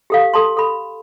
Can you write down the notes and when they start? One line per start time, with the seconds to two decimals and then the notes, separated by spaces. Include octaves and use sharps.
0.10 G4 A4 F5
0.34 A4 A5 C6
0.57 A4 B5